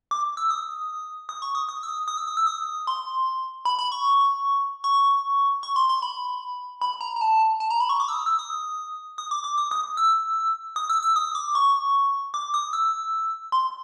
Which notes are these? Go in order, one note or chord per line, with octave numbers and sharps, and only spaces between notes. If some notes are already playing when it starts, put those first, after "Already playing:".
D6
E6
D#6
D#6
C#6
D#6
D#6
E6
D#6
D#6
E6
D#6
E6
D#6
C6
B5
B5
C#6
C#6
C#6
C6
C6
B5
B5
A#5
A#5
A5
A5
A#5
B5
C#6
D6
E6
D#6
E6
D#6
D#6
D6
D6
D#6
D#6
E6
D#6
E6
E6
D#6
D6
C#6
D6
D#6
E6
C6